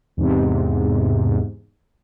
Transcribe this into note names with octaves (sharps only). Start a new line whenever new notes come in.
E2 G#2 C3